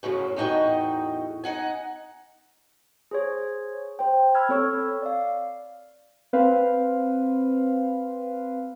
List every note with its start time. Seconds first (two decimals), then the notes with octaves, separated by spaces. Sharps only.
0.03 F#2 A2 C#3 F#3
0.36 E2 A2 D#4 F#4 D#5 G5
1.44 D#4 F#5 G#5
3.11 G#4 C5 C#5
3.99 C5 G5
4.35 B5 E6 F6 G#6
4.49 C4 A4 C#5 C#6 E6
5.02 D5 F5
6.33 C4 B4 C5 F5